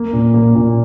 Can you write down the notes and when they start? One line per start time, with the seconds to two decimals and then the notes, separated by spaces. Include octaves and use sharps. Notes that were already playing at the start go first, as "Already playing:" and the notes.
Already playing: A#3
0.13 A#2
0.34 A#3
0.55 A#2